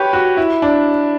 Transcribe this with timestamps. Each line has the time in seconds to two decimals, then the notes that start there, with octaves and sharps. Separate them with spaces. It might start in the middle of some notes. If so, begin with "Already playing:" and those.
Already playing: G4 B4 C#5
0.13 F#4
0.37 E4
0.62 D4